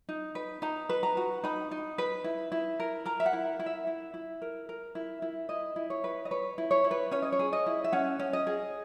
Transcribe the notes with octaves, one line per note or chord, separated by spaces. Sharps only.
D#4
B4
D#4 A#5
B4
A#5
F#4
D#4 B5
D#4
B4
E4
E4
A#4
A#4 A#5
E5
F#5
E4
E4
E5
E4
E4
A#4
A#4
E4
E4
E4 D#5
E4
C#5
B4
D#5
B4 C#5
E4
C#5
E4
B4
C#4 C#5
D#5
C#5
G#4
D#5
E4
E5
C#4 F#5
C#4
D#5
G#4